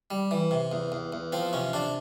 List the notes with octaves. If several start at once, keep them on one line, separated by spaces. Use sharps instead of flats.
G3
E3
C3
E2
E2
E2
F3 C4
C3 C#4
C3 D4